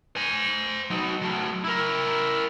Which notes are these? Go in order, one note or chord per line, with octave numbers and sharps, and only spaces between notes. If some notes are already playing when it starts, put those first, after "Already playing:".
C5 G#5
F#3 D#4
F#3 A3
E4 A#4